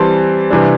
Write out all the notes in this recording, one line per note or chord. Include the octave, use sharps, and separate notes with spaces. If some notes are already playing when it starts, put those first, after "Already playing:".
Already playing: E3 G3 C4 A5 C6
C3 E3 G3 D4